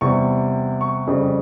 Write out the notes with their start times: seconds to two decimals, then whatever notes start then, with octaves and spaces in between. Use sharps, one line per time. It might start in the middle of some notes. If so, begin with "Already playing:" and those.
0.01 E2 C3 G3 C#6
0.81 C#6
1.07 F2 C#3 G3